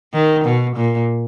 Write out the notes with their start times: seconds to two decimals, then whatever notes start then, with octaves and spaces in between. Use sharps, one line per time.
0.14 D#3
0.44 B2
0.76 A#2